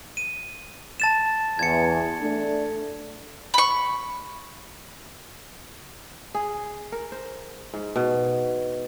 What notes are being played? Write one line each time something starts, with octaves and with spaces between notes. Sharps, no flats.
D#7
A5 A6 E7
E2 G#6 C#7
A3 D4
B5 C#6
G#4
A#4
C5
G#2
B2